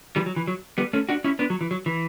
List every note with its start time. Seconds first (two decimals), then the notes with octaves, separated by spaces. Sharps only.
0.16 E3 G3
0.26 F#3
0.36 E3
0.47 F#3
0.78 G3 B3
0.93 A3 C#4
1.09 D4 F#4
1.24 C#4 E4
1.39 B3 D4
1.50 F#3
1.61 E3
1.71 F#3
1.86 E3